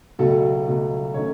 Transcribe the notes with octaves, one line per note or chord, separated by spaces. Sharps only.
C#2 B2 F#3 A3 A4
C#2 B2 F#3 A3
D#3 A3 C#4 C#5